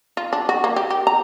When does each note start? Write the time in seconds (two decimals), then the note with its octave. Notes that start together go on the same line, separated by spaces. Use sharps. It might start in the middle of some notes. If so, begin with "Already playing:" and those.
0.17 F4
0.33 D4
0.49 F#4
0.64 A#3
0.76 G4
0.90 G4
1.07 A#5